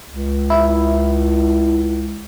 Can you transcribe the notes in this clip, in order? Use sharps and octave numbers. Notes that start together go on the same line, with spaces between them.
C#2
E4